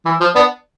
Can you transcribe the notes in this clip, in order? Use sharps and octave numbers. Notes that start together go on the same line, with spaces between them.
E3
F3
B3 D4